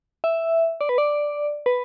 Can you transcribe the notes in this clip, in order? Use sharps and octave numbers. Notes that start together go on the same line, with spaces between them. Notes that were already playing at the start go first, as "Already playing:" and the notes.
E5
D5
B4
D5
B4